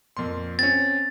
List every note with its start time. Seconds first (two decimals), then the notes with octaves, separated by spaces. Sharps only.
0.17 F2 A#2 C6
0.59 C4 C#4 A6